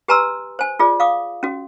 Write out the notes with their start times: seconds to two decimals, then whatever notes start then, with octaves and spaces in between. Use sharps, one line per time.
0.08 G4 B4 G#5 A#5 C6 E6
0.59 C5 G#5
0.79 F4 G#4 D5
1.00 F5 D6 D#6
1.43 C#4 F#4